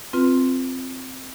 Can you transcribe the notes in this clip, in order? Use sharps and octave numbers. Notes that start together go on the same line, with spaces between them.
C4 F4 B4